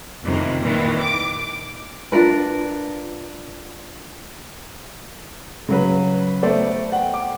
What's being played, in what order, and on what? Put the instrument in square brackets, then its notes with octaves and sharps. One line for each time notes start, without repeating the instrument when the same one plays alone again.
[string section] F2 C3 D#3 E3
A#2 D#3 E3
D6
[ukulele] D4 F4 A#4 B4
[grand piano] C#3 F#3 B4
A3 B3 C5 D5
F#5 G5
D6